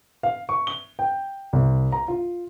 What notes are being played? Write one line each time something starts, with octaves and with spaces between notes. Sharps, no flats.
F5
C#6
G7
G5
C2
A#5
F4